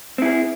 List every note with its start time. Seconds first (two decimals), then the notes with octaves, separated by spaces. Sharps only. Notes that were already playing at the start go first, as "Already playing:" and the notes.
0.18 C4
0.22 E4
0.26 G#4